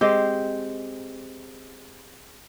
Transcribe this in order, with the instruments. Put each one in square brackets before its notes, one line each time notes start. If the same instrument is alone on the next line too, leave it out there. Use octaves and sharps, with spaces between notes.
[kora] G#3 C4 G4